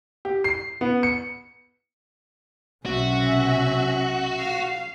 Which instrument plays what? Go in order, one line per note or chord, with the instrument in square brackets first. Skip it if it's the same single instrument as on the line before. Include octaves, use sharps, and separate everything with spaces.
[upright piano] G4
C7
B3
C#7
[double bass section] B1 C3 [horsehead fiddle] C#4 E5 [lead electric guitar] F#4
[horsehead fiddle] F5